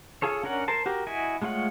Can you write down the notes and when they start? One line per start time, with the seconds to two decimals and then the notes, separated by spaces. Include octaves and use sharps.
0.22 F4 G#4 A4 C#5
0.44 C#4 D4 A#4 C#5 F#5
0.68 A#4 C5 A5
0.86 F#4 G4 A#4
1.07 E4 F#4 D#5 G#5
1.42 G#3 A3 F4 C#5 F#5